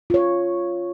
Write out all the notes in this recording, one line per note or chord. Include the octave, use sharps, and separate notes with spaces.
F4 C#5